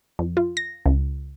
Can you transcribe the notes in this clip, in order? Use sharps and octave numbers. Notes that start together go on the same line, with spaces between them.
F2
F4
A#6
C#2